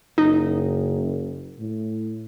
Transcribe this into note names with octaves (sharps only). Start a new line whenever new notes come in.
F#1 D#4
A2